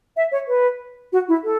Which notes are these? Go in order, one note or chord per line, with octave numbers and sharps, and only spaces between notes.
E5
C#5
B4
F#4
E4
A4